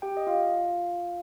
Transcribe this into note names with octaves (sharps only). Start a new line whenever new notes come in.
G4 G5
D#5
F4 F5